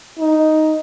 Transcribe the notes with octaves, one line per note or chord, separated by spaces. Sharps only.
D#4